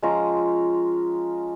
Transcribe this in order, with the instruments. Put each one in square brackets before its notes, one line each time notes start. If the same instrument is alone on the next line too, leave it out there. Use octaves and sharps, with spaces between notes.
[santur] F3 G#3 C#4 F4 A#5